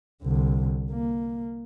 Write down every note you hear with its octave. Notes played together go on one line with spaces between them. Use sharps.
C2 D3
A#3